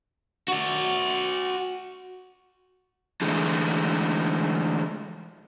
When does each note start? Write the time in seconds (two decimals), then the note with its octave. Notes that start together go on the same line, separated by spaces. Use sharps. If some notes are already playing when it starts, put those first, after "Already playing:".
0.48 F#4 D5
3.21 D3 E3 G#3 A3